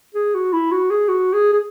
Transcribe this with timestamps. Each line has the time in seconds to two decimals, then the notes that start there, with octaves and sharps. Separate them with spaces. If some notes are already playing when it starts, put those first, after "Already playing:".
0.15 G#4
0.35 F#4
0.53 E4
0.72 F#4
0.91 G#4
1.09 F#4
1.33 G#4
1.53 G#4